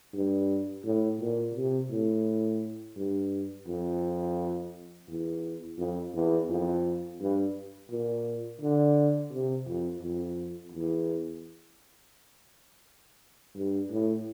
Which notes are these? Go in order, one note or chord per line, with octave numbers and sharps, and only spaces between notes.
G2
A2
A#2
C3
A2
G2
F2
E2
F2
E2
F2
G2
A#2
D3
C3
F2
F2
E2
G2
A2